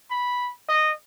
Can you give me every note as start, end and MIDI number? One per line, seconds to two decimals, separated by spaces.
0.10 0.52 83
0.69 0.91 75